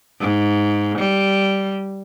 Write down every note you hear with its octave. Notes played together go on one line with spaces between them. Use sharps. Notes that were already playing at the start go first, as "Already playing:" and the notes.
G#2
G3